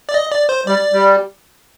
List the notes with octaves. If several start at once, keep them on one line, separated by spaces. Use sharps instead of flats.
D5
D#5
D5
C5
G3 D5
G3